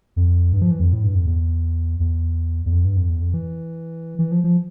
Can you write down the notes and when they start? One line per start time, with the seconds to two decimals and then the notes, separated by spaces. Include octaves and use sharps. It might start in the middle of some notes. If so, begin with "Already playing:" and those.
0.16 F2
0.53 G2
0.62 F3
0.71 E3
0.80 F2
0.93 A2
1.04 G2
1.15 F2
1.26 E2
2.00 E2
2.66 E2
2.72 F2
2.85 G2
2.97 F2
3.09 E2
3.22 F2
3.34 E3
4.19 E3
4.32 F3
4.44 F3